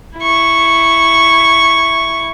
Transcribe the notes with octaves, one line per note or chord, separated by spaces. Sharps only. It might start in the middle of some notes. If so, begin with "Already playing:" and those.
E4 C#6